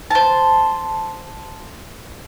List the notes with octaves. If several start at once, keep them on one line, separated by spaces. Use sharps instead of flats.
C5 A5